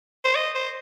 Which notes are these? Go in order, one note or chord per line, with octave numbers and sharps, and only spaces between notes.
C5
D#5
C5